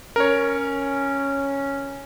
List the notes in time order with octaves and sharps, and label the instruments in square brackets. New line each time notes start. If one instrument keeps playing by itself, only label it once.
[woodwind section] C#4 [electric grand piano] A#4 C#5